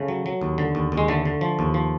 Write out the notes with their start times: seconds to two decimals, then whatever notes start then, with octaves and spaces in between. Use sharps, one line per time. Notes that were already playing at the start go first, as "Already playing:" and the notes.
Already playing: C#3 A3
0.08 F#3
0.26 F#3
0.41 D#2
0.58 D3
0.75 D#2
0.92 D#2
0.98 G#3
1.08 D3 A3
1.25 D3
1.41 F3
1.59 D#2
1.74 F3